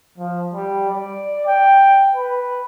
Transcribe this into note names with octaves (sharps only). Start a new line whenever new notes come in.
F3
G3
D5
G5
B4